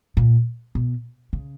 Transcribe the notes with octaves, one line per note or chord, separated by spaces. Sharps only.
A#2
B2
C#3